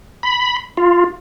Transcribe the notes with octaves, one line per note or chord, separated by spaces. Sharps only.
B5
F4